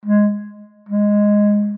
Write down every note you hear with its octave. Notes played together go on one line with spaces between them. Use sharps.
G#3
G#3